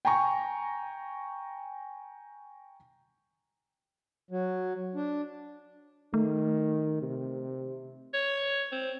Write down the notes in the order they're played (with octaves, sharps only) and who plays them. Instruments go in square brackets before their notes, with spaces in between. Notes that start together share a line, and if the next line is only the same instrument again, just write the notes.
[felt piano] G5 G#5 A#5 C#6
[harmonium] F#3
D4
[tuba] D#3 [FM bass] A3
[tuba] C3
[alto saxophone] C#5
C4